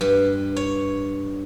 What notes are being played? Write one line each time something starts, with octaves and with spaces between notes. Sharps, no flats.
G2
C#5